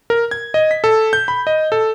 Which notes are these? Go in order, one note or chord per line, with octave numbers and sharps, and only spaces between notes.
A#4
G#6
D#5
B6
A4
G6
B5
D#5
A4